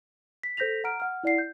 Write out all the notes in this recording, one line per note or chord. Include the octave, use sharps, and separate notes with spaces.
B6
A4 C5 G6 A#6 B6 F7
F#5 A#5 F6 D7
F#5 F6
E4 D5 F#5 C7
G6